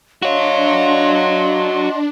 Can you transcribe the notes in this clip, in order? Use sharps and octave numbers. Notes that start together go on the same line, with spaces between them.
D4 F#4 C#5 D#5 F5 F#5 C6